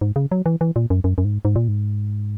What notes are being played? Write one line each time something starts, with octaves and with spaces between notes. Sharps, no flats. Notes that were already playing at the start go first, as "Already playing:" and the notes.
G#2
C#3
F#3
E3
E3
A#2
F#2
F#2
F#2
G#2
G#2
A#2
G#2